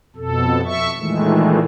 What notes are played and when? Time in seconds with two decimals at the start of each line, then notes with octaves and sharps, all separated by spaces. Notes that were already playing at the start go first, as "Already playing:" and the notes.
0.16 F2 B2 A4
0.65 E5 C#6
0.97 A#2 D#3 E3 G#3 A3